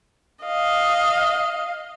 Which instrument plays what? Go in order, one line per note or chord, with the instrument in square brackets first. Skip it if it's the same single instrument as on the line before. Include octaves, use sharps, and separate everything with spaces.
[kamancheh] D#5 F5